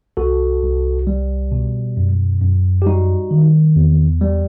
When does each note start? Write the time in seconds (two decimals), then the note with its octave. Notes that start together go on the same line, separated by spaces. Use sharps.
0.17 C2 F#4 A4
0.62 C2
1.07 G3
1.52 B2
1.97 F#2
2.41 F#2
2.82 G4
2.86 G3 D#4 F#4
3.31 D#3
3.76 E2
4.21 G3